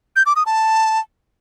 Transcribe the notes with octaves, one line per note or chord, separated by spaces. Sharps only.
G6
D6
D#6
A5